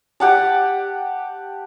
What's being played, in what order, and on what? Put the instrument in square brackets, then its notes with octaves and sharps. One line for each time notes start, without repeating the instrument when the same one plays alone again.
[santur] G4 F#5 A5